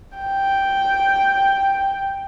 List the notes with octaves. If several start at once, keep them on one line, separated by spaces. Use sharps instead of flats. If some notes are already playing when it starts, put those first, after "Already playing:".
G5